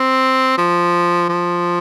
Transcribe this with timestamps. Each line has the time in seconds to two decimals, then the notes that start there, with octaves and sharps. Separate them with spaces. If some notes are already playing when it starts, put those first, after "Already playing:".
Already playing: C4
0.58 F3
1.29 F3